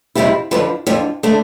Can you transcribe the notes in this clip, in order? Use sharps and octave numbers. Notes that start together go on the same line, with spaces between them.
F2 C3 G3 C4 E4
F2 D3 F3 B4
F2 D3 F3
D3 A3 D4